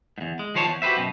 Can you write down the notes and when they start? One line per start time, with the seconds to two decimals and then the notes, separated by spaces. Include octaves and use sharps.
0.18 E2 G#2
0.39 G#3
0.55 D#3 F3 C5 C#5 G5 A5
0.67 E2
0.82 F#4 G4 A4 B4 C5 E5
0.97 F#2 B2